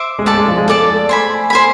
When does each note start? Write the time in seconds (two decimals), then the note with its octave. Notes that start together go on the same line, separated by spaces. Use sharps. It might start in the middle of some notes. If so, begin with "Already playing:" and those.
Already playing: C5 E5 D6
0.19 G#3
0.26 A3 A4 D5 A5
0.37 G#3
0.48 F3
0.57 G#3
0.68 A4 D5 A5
0.88 A3
1.09 C5 G#5 B5
1.50 C5 G#5 B5